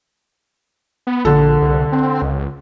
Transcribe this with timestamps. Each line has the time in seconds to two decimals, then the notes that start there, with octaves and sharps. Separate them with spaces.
1.07 B3
1.25 A#1 D3 A4
1.62 C2
1.92 C4
2.22 C#2